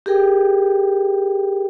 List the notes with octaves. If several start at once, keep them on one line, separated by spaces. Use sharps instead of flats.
G4 G#4 A#4 G5